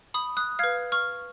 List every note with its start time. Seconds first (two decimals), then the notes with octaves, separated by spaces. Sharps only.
0.14 B5 D#6
0.37 D#6 F#6
0.59 B4 F5 F6 G#6
0.92 C#6 F6